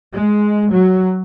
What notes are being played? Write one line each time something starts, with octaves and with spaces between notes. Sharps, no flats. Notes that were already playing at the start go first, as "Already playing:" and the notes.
G#3
F#3